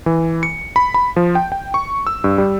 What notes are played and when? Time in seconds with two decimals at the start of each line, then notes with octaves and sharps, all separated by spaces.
0.06 E3
0.43 C#7
0.76 B5
0.94 B5
1.16 F3
1.35 G5
1.52 G5
1.74 C#6
2.07 E6
2.24 G2
2.38 G3